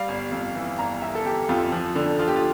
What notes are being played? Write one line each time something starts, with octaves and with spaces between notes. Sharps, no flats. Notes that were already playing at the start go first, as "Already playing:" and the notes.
Already playing: G3 F5
G1
F2
E3
G1 A#5
G1 E5
A4
E3 G4
F2 F4
F3
D3
F3 F4
G4
F4